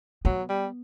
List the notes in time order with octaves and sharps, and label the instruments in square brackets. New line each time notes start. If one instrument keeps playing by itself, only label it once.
[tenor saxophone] F#3 [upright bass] B3
[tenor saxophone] G3